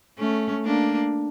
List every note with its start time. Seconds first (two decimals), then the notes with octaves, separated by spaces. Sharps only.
0.19 A3 C#4
0.65 A#3 D4